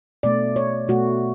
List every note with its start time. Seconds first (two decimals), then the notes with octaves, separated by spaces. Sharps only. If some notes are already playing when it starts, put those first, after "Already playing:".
0.23 B2 A3 D5
0.56 C#5
0.88 B2 A3 F#4